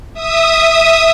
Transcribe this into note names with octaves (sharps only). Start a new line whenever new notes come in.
E5 D#6